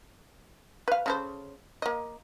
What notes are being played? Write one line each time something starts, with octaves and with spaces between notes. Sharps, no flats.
B4 F5
C#3 A4 C5
A#3 D#5